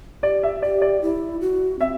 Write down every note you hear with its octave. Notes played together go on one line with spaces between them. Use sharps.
G4 D5
E5
G4 D5
D5
E4
F#4
C4 E5